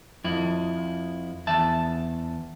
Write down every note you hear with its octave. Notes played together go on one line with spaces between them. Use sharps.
F2 E4
E2 E5 A5